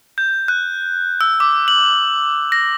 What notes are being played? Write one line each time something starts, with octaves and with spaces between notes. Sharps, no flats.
G6
F#6
E6
D6
F#7
A#6